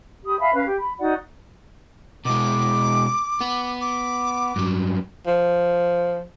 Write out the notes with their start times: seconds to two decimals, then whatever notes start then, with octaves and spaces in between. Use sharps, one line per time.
0.24 G4 B5 D#6
0.40 E5 F5 G#5 B5
0.53 C#4 B4 F5
0.67 G4
0.79 B5
0.99 D#4 F#4 D5 F#5
2.25 B2 G#3 D6
3.41 B3
3.81 D6
4.56 G2 F#3
5.27 F3